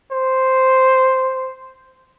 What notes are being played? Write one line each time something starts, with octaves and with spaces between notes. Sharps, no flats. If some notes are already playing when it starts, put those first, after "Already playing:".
C5